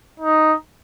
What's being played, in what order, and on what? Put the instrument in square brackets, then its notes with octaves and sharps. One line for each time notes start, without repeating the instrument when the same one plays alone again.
[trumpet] D#4